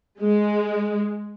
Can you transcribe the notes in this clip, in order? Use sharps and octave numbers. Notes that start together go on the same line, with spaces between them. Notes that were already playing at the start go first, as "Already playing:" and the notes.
G#3